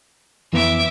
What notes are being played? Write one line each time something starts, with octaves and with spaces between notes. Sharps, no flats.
F2 E3 B3 E5 D6